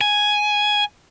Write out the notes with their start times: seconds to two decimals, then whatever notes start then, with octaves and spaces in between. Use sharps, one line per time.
0.01 G#5